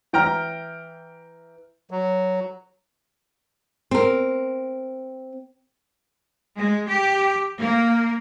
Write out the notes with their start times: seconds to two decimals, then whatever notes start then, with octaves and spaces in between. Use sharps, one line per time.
0.13 E3 G5 A#5 F6
1.91 F#3
3.91 C4 A#4
6.57 G#3
6.88 G4
7.60 A#3